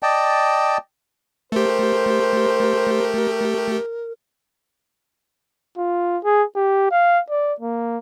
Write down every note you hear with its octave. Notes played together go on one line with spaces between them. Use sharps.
D5 D#5 G5 A5
A3 G4 A#4 C5
F4
G#4
G4
F5
D5
A#3